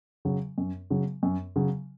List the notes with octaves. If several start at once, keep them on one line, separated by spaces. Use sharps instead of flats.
C#3 F#3
F#2
C#3 F#3
F#2
C#3 F#3